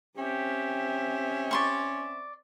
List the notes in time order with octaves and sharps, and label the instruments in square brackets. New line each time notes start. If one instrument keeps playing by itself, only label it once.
[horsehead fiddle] C4 E5 [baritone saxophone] C#4 [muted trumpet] G4
[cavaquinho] D5 C6 C#6